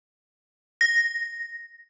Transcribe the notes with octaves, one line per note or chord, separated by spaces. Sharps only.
A#6